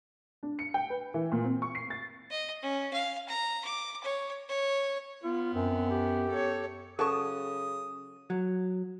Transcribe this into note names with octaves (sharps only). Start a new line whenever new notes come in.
D4
C#7
G5
B4
E3
A#2
C4
C#6
C7
A6
D#5
C#4
F5
A#5
D6
C#5
C#5
B3 F4
F#2 C4
G4
A4 C#5
C#3 F#3 G#4 A4 A5 C#6 D#6
F#3